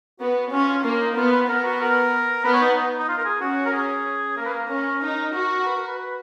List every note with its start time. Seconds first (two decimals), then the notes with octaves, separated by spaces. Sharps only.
0.20 B3 F#4
0.51 C#4 F4
0.68 F4
0.84 A#3 F4
1.00 D#4
1.16 B3 F4
1.32 B4
1.48 B3 A#4
1.64 F#4
1.81 A#4
2.44 B3 B4
2.53 C#5
2.61 D#4
2.76 D#4
2.98 D#4
3.09 F4
3.18 A#4
3.25 G#4
3.41 C#4 F#4
3.66 A#4
3.73 G#4
4.37 A#3 A#4
4.45 B4
4.53 A#4
4.70 C#4
5.02 D#4
5.34 F#4
5.65 B4
5.76 A#4
5.87 B4
5.99 B4